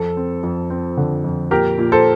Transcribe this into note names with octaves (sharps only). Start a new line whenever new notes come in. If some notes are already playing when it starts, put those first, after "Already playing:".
Already playing: F2 A4
C4
F2
C4
D3
F2
A#2 G4 A#4
A#2
A4 C5